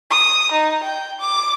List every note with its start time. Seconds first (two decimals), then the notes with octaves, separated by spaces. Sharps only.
0.10 D#6
0.52 D#4
0.83 G5
1.20 D6